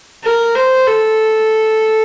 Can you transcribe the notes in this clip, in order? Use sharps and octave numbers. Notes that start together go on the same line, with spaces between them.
A#4
C5
A4